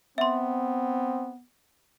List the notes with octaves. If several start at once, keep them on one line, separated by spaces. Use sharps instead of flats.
B3 C4 E5 C6